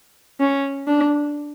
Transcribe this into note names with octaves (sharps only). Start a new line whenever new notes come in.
C#4
D4